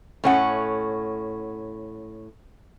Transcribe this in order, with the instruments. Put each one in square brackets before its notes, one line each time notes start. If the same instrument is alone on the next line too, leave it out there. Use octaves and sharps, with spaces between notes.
[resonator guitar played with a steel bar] A2 C#4 F#5